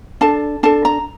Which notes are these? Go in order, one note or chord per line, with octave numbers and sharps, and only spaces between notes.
D4 A4 A5
D4 A4 A5
A#5